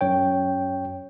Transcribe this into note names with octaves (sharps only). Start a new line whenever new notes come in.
F#2 C#5 G5